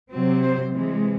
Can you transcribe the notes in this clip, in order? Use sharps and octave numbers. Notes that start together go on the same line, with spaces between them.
C3 F#3 C4
C5
C3 E3 G#3